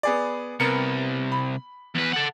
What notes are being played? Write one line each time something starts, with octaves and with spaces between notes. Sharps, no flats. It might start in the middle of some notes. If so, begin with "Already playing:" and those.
B3 G#4 D5
C2 B3 A#4 C#7
B5
E2 B4
A4 F#5